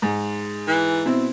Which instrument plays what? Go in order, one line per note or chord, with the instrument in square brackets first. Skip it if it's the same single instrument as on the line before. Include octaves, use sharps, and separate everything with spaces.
[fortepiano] G#2
[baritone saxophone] E3
[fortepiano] B2 C4 E4